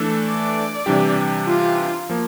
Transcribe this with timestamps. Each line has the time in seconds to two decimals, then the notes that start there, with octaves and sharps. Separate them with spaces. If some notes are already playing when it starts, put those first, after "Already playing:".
Already playing: E3 A3 D4 A4
0.24 D5
0.86 C3 E3 G3 D4 G4
1.48 F4
2.10 F3 A#3